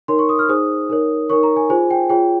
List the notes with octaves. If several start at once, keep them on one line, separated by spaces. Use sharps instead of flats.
D#4 A#4 C#5 C6
C#6
D#6
F6
D#4 G#4 C5 D#6
D#4 A#4 C#5
D#4 A#4 C#5 C#6
A#5
G#5
F4 G#4 C5 G#5
G5
F4 G#4 C#5 G5